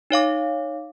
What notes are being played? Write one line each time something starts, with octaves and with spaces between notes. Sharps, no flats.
D#4 C#5 F5 D6